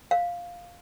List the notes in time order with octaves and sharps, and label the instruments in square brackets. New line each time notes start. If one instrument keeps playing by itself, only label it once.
[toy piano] F5